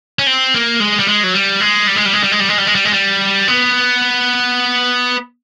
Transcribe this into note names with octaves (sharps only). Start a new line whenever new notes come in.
C#4
C4
A#3
G#3
G3
G#3
F#3
G3
G#3
G3
G#3
G3
G#3
G3
G#3
G3
G#3
G3
G#3
G3
G#3
G3
B3